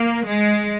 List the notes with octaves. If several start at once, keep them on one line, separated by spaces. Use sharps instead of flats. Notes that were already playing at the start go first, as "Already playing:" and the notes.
Already playing: A#3
G#3